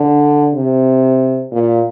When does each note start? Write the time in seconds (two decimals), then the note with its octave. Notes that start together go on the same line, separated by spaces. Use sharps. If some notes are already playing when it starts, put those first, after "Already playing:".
Already playing: D3
0.55 C3
1.53 A#2